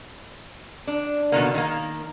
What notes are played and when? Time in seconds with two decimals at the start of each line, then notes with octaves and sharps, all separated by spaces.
0.87 D4
1.32 B2 D3 D#3 A#3
1.54 D#3 A#3